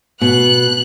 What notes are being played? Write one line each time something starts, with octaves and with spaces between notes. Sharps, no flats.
B2 F#6